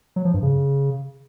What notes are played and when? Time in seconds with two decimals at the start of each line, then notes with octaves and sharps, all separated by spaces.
0.16 F#3
0.25 F3
0.34 G2
0.43 C#3